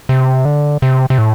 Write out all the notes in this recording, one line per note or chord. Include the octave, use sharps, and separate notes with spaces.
C3
D3
C3
C3
A2